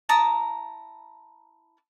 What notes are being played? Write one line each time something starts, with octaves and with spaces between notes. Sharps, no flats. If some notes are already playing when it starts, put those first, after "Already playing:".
E4 A5 A#5 D#6